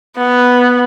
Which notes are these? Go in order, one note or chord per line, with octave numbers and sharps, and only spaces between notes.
B3